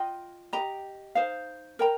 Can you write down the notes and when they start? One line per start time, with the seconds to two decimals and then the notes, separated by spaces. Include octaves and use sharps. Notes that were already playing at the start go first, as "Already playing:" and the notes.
Already playing: F4 D#5 G5
0.53 G4 D#5 A#5
1.15 D#4 C5 F5
1.79 A#4 G5 A#5